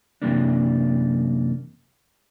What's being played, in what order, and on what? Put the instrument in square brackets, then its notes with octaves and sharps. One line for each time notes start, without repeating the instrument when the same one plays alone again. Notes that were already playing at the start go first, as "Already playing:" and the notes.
[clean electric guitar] F#2 C3 E3 F#3 A#3 D4